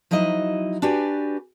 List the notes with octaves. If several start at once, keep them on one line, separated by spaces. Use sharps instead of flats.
F3 F#3 D#4 E4 D#5
D4 F#4 G4 B4 D5 G#5